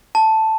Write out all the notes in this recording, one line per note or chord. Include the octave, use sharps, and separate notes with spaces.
A5